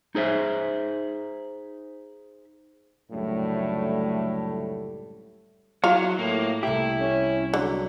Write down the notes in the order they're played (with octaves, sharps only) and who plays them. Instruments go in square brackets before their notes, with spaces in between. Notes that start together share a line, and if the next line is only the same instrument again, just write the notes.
[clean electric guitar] D#4 G#4 C5 E5
[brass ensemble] C#2 F#2 A2 D3 G3 A3
[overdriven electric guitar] F#3 [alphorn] E4 [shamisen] F4 F5
[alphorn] A2 [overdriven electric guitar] A#3
[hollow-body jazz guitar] C2 G4 [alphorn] A3 [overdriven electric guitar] E4
[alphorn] C#4
[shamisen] D3 [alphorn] F#3